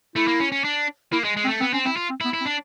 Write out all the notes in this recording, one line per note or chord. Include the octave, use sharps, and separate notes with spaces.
A3 E4
A#3
C#4
C#4
D4
A#3 E4
G#3
G#3
C4
A3
B3 C4
C4 C#4
C4 E4
F4
C4
E4
B3
E4
C4
D4